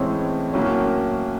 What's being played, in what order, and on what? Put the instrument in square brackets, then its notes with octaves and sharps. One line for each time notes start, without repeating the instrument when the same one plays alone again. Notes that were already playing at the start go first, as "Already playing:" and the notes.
Already playing: [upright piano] A2 E3 G#3 C#4 [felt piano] C4
[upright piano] A2 F#3 A#3 [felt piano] C#4